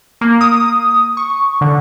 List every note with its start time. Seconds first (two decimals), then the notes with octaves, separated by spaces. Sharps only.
0.21 A#3
0.41 D#6
1.17 C#6
1.61 D3